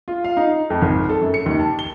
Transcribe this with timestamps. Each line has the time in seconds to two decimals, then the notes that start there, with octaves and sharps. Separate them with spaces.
0.08 F4
0.24 F5
0.37 D#4
0.70 F2
0.82 G#1
1.09 A4
1.21 F#2
1.34 C#7
1.46 D#2
1.60 A5
1.79 G7